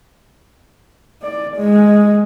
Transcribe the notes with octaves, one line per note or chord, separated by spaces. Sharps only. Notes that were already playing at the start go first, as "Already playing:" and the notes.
D5
G#3